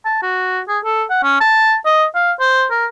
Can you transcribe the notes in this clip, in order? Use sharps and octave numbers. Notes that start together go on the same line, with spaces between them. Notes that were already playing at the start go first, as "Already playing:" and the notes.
A5
F#4
G#4
A4
F#5
C#4
A5
D#5
F5
C5
A#4